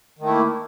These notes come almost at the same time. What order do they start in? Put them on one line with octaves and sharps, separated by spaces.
D#3 A3 E4 A#3